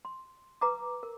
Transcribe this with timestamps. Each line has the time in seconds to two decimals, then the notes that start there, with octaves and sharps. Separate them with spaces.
0.05 C6
0.61 B4 A#5 D6
1.03 A#4